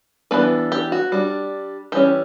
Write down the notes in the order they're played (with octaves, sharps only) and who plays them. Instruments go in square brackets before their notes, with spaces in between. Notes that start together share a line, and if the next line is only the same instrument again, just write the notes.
[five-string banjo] E3 G3 B3 D4 B4
G4
F#4
G3 D4
E3 G3 C#4 G4